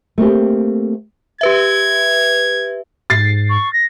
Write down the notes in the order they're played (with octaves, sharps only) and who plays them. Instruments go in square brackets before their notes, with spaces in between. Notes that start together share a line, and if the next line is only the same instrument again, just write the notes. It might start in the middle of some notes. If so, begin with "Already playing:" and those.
[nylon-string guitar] A3 A#3 C4 G4
[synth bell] G4 B4 E5 [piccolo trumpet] G#6
[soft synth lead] G#2 [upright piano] A6 C7
[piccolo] C#6
A#6